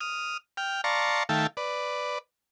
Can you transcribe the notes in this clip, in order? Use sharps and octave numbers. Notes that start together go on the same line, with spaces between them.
D#6 F6
G5 F6
D5 F5 A5 A#5 C6 C#6
D#3 A3 E5 F5 G5 A5
B4 D5